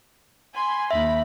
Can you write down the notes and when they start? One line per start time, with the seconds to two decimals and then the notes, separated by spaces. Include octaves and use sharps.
0.55 G#5 B5 C6
0.91 D#2 E5 B5